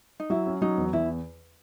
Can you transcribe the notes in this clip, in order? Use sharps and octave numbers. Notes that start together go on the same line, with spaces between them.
D#4
F#3 E4
C#4
F#3 D#4
E2
E2 E4